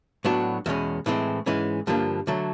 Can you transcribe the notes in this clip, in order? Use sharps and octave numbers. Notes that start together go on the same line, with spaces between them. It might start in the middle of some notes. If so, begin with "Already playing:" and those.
A2 F#3 B3 D4 F#4
E2 B2 G#3 C#4
A2 E3 G#3 C4
G#2 E3 G#3 C#4
G2 D3 F3 A#3 D4
D3 F#3 A3